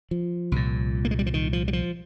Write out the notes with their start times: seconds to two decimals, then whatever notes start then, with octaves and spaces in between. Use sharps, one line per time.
0.11 F3
0.52 C2 A#2
1.05 A#3
1.11 G#3
1.19 G3
1.26 F3
1.34 D#3
1.53 F3
1.68 G3
1.73 F3